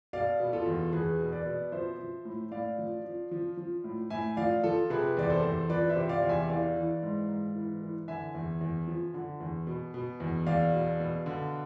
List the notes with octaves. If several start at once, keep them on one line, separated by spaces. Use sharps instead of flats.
B2 D5 F5
B2
F4 A4
E2
E2 G#4 B4
B2
B4 D5
B2
F3 C5 E5
F3
A2
A2 D5 F5
F3
F3
F3
F3
A2
A2 E5 G#5
F3 D5 F5
F3 F4 A4
C3 G#4 B4
E2 D5
A4 C5
E2
F3 B4 D5
C5 E5
C3
D5 F5
E2
E5 G#5
E3 D5 F5
E3
G#2
G#2
E3
E3
D3 E5 G#5
E2
E2
F3
D3
E2
B2
B2
E2
E2 D5 F5
B2
B2
D3